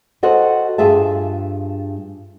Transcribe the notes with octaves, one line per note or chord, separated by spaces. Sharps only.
F#4 A4 C5 D#5 F#5
G2 F4 G#4 E5 A5